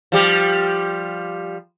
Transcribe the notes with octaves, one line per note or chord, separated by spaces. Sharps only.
F3 G3 G4